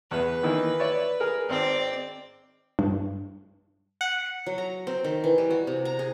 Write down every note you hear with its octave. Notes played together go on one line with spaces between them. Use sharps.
E2 B4
D#3 E3 A#3
C#5 D5 E5
G#4 A#4
G#1 C4 D5
G2
F#5
F#3
A#5
C4
D#3
E3
G3
F#4
C3
A#5
G#4